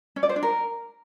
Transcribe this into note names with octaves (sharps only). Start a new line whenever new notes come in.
C#4
D5
C5
D4
A#4